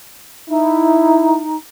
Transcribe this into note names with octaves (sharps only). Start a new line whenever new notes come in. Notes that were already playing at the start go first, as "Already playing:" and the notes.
D#4 E4